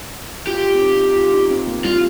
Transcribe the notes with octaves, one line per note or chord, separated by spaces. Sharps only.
F4 G4
C4
D#4
F4
D#4
C4
A#3
G3 F4